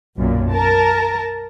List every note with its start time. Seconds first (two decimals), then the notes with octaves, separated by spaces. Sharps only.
0.16 B1 F#2 A#2
0.51 A#4 A5